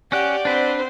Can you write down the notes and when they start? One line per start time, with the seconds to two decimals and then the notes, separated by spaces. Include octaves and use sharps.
0.12 C#4 G4 D5 F#5 F#6
0.45 C4 D4 B4 C5